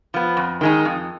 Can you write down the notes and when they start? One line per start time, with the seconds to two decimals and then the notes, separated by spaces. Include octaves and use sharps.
0.14 F3 B3
0.37 F2
0.61 D#3 G#3 D#4
0.85 F2